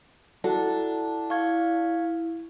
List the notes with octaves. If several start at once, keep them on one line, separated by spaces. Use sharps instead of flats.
D4 E4 F#4 A4
E4 F5 C#6 G#6